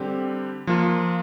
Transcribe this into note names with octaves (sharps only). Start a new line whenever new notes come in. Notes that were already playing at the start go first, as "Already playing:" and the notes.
Already playing: D3 G3 C4 G4
F3 A#3 F4